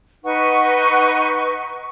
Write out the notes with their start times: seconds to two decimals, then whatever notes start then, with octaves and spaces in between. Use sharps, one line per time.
0.24 D#4 B4 F#5 C#6